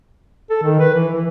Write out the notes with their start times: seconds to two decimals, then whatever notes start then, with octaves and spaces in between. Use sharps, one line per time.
0.50 A4
0.62 D#3
0.80 B4
0.94 E3
1.13 E3